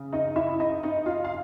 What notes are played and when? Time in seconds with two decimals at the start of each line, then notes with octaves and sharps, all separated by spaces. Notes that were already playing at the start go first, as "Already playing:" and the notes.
Already playing: C#3
0.13 D#4 D#5
0.36 E4 E5
0.60 D#4 D#5
0.83 D#4 D#5
1.06 F4 F5
1.24 F5